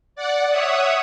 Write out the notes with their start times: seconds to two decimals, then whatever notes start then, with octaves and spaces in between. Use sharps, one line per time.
0.16 D5 F#5
0.49 C#5 E5 F#5 D#6